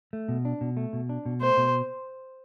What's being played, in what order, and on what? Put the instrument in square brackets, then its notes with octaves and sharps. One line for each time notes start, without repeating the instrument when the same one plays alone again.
[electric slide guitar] A3
B2
D4
B2
A3
B2
D4
B2
[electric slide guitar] A3 [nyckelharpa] C5
[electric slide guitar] B2